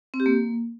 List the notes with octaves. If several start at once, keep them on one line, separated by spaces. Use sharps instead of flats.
C4
G4
A#3